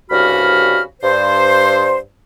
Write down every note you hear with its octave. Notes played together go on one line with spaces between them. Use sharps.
C2 G2 C#3 F#4 B5 F6
G2 C5